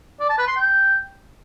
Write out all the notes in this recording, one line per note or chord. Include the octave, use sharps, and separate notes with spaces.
D5
A5
B4
C6
G5